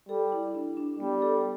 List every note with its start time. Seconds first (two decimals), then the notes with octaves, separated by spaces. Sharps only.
0.09 G3 A4
0.32 E4
0.55 D4
0.77 D4
0.99 G3 B3
1.22 A4